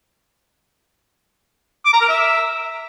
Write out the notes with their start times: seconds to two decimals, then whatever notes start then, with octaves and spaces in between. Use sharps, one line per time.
1.85 D6
1.93 A#5
2.01 A#4
2.09 E5